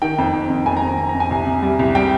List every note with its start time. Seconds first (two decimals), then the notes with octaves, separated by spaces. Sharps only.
0.02 D#3 G5
0.18 F2
0.34 F2
0.50 F2
0.66 F2 G#5
0.77 A#5
0.82 F2
0.88 A#5
0.99 F2
1.09 A#5
1.14 F2
1.20 G#5
1.30 C2
1.47 C3
1.63 G3
1.79 C2
1.95 G3 G5